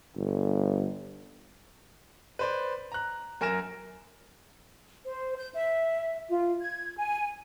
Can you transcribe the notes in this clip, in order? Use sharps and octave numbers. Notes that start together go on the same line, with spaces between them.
G1
B4 C5 D5
A#5 F#6
F#2 A#4 G#5 F6 A#6 E7
C5
G6
E5
F4
G#6
G#5